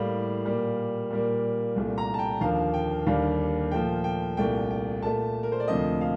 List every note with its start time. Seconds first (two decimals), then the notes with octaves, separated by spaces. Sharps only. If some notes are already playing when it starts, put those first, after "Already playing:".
Already playing: A2 G3 A#3 F5
0.45 A#2 G3 A#3
1.10 A#2 G3 A#3
1.76 C2 A#2 A3
1.98 A#5
2.14 A5
2.19 G5
2.41 D#2 D3 F3 A#3 F5
2.74 G5
3.06 D#2 D3 G3 A#3 F5
3.71 A#2 F3 A3 G5
4.04 G5
4.37 C2 A#2 A3 G5
4.70 G5
5.02 A#2 A3 A5
5.43 A#4
5.52 C5
5.60 D5
5.68 D2 C3 F3 A#3 D#5
6.01 F5